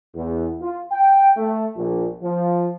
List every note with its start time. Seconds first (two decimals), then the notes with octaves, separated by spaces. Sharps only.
0.15 E2
0.61 F4
0.91 G5
1.36 A3
1.76 A#1
2.22 F3